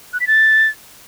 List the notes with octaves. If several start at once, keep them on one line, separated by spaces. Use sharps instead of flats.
F#6
B6
A6